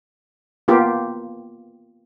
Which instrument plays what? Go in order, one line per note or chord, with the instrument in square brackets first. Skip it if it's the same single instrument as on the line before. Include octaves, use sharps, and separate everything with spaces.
[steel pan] A#3 B3 F4 G4